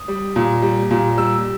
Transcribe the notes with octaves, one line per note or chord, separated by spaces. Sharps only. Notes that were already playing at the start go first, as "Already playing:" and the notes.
Already playing: D#6
G3
A#2
G3
A#2
G3 E6